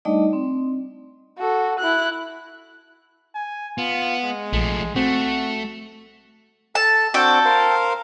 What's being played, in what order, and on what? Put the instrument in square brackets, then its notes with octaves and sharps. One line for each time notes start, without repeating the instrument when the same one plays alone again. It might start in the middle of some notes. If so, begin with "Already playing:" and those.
[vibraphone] G3 A3 D4 D#4 D5 D#5
C4
[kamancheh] F#4 A4
E4 F#6
[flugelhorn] G#5
[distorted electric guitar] B3 [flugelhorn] F4
[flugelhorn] G#3
[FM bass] A#1 [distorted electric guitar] F3 A3
[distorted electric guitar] A3 [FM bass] C4 [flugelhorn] F#4
[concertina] A4 [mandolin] A5
[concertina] C4 D4 F#4 [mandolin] A4 G5
[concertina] A#4 C5 F5